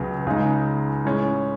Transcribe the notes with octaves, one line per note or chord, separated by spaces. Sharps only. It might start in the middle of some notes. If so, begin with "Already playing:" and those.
Already playing: C#2 C#3 F#3 B3
C#2 C#3 G#3 D#4
A2 G#3 C#4